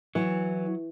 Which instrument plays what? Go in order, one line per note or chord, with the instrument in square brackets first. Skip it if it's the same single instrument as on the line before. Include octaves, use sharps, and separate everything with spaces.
[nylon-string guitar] E3 [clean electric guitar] F#3